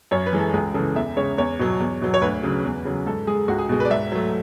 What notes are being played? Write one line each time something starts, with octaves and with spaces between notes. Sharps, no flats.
F#2 C#5
B4
E3 G#3
A4
C#2 G#4
C#3 E3 A4
E2 E5
C#3 G#3 C#5
E2 C#5
B2 F#3
E2
B2 F#3
C#5
D2 B4
C#3 F#3
E2
C#3 F#3
G#2 A4
G#3 G#4
C#2 F#4
G#4
B2 G#3
B4 D5
G#2 E5
F#3 A3